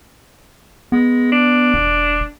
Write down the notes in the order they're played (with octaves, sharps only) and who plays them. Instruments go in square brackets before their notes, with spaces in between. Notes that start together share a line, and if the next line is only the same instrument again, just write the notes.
[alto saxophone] G#3 [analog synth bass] B3
[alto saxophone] D4
[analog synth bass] E1